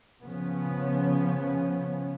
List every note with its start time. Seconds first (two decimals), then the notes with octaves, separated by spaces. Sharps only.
0.22 C#3 F3 B3 C#4